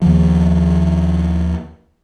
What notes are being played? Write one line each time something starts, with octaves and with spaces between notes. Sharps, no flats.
D#2 D#3 F3